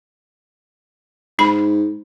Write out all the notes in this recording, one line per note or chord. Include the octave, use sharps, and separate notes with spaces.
G#2 D#4 B5